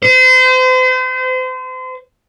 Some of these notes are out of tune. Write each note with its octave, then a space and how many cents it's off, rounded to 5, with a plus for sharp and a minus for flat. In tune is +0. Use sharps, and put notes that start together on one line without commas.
C5 -35